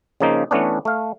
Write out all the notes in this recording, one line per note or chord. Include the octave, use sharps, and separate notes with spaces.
C#3 F3 A#3 C4 D#4
E3 A3 B3 C#4 D4
A3 F5